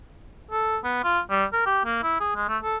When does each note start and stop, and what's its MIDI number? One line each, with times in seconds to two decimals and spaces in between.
0.51 0.78 69
0.84 1.03 59
1.04 1.20 65
1.30 1.45 55
1.53 1.66 70
1.66 1.82 67
1.85 2.02 58
2.03 2.19 64
2.20 2.32 68
2.35 2.47 56
2.49 2.57 57
2.63 2.77 69